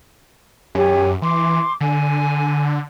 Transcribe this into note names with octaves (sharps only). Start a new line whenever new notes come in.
F#2 G4 C#5 G#5
E3 C6 D6
D3 G#5